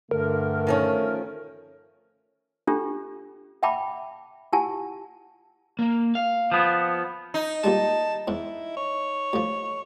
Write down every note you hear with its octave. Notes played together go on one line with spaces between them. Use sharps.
G2 D3 A3 A#4
D#3 F3 C#4
C#4 D4 F4 G4 A4
E5 F#5 G5 A5 B5 D6
E4 F4 G4 F#5 G#5 A5
A#3
F5
F3 B3
D#4
A#2 G3 G#3 A5
E2 G#2 E4
C#5
D2 F3